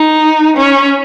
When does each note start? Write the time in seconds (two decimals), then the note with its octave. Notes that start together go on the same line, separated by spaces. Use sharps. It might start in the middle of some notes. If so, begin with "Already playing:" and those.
Already playing: D#4
0.57 C#4